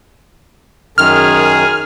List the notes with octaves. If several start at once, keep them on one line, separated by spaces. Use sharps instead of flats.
F#2 D#3 G#4 F6